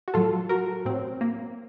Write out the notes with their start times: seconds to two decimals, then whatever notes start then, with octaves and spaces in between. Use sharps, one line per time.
0.08 F#4
0.14 A2 F#3 F4 A4
0.49 F#4 A#4
0.85 A2 F#3 C4
1.21 A#3